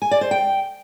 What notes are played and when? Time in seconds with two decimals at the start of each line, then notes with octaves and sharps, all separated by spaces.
0.02 G#5
0.11 D5
0.21 C5
0.31 G5